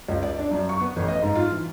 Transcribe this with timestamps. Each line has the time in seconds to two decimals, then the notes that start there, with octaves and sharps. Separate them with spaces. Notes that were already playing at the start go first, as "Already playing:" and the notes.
0.08 C#2
0.23 D5
0.39 D4
0.51 F#2
0.69 C#6
0.81 B3
0.96 A1
1.08 D#5
1.22 G#2
1.35 F4
1.51 E3